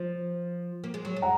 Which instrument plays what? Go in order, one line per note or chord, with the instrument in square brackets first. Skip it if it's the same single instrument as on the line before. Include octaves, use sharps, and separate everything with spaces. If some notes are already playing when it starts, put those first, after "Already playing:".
Already playing: [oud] F3
A#3
G#3
F#3
G#3
[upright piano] F#5 A#5